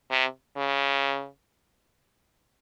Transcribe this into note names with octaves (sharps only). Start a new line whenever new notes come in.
C3
C#3